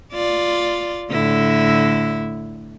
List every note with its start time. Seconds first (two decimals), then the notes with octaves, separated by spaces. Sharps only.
0.13 F4 D5
1.11 A2 D3 E4